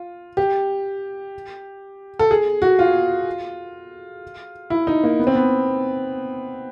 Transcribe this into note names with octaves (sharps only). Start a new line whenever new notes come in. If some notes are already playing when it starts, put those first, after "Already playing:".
Already playing: F4
G4
A4
G#4
F#4
F4
E4
D#4
A#3
B3
C4
B3